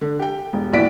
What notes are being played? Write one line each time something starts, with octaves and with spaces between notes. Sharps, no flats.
D3
G4 G5
E1
A#1 E3 F#4 D5 B6 D7